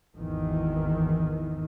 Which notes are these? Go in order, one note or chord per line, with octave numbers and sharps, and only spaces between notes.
G#1 E2 D#3 E3